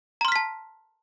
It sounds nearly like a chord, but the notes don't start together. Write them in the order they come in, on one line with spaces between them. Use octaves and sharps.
A#5 C6 F6 B6 A5